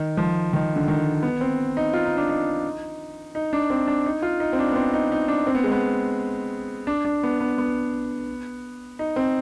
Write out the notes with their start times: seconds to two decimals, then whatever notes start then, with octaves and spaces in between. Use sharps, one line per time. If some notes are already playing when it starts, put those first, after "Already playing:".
Already playing: D#3
0.17 F3
0.53 D#3
0.76 D3
0.88 D#3
1.23 B3
1.41 C4
1.77 D#4
1.93 F4
2.05 D#4
2.17 D4
2.29 D#4
3.35 D#4
3.53 D4
3.70 C4
3.88 D4
4.06 D#4
4.22 F4
4.40 D#4
4.53 C4
4.59 D4
4.72 B3
4.76 C4
4.93 D#4
5.12 D#4
5.28 D4
5.47 C4
5.55 B3
5.64 G#3
5.72 B3
6.87 D4
7.05 D4
7.23 B3
7.41 B3
7.58 B3
8.99 D#4
9.16 C4